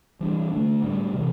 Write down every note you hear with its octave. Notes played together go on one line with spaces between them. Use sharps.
E3 G3 D4
D3 A3 D4
A2 G3 D4
C3 E3